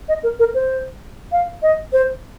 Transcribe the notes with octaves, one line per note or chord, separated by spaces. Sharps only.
D#5
A#4
A#4
C5
F5
D#5
C5